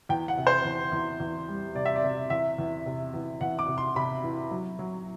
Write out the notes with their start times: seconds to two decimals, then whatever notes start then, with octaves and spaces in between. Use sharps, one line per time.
0.09 E2 G5
0.28 F#5
0.38 C3
0.47 C5
0.65 E2
0.92 E2
1.20 E2
1.48 G3
1.75 C3 D5
1.85 E5
1.96 D5
2.04 C3
2.30 E2 E5
2.58 E2
2.86 C3
3.14 E2
3.41 E2 F#5
3.59 D6
3.68 C3
3.78 C6
3.96 C3 B5
4.24 E3
4.51 F#3
4.79 F#3